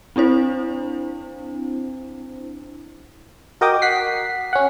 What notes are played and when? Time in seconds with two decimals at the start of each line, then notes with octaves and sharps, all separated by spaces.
0.16 C4 D4 E4 C5
3.61 F#4 A#4 D#5 G5 D6 D#6
3.82 F#5 B6 C7
4.53 C#4 F#5